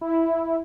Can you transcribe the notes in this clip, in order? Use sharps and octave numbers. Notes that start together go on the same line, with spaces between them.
E4